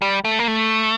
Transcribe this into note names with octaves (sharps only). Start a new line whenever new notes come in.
G3
A3
A#3
A3